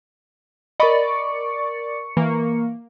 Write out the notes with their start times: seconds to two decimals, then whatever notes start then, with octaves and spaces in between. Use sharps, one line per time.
0.80 A#4 D5 D#5 B5 C#6 C#7
2.17 E3 A#3